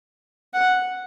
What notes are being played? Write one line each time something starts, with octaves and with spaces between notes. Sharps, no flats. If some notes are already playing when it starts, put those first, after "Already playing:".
F#5